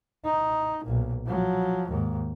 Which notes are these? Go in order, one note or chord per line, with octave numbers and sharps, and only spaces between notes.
D#4
B1 A#2
F3 F#3
D#2 G#2